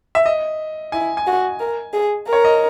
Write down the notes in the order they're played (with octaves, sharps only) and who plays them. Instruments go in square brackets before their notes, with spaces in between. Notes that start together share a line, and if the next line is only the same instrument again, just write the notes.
[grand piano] E5
D#5
[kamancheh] E4 [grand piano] G#5
[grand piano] G#5
[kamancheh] F#4
A#4
G#4
[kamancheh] A#4 [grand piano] C#5
[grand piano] D#5